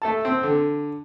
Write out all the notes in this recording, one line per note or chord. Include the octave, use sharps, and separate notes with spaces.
A3 A4 A5
C4
D3